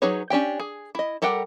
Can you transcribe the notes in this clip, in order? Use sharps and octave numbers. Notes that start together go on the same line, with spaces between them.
F#3 D#4 G#4 B4 C#5
C#4 D4 G4 G5
G#4
E4 D#5
G3 A4 A#4 F#5 G5